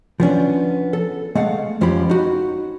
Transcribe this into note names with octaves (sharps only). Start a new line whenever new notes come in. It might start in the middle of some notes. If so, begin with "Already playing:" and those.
F3 B3 C#4 D4
A4
G#3 A3 F5 F#5
F2 F3 C#4 G4 B5
D#4 F#4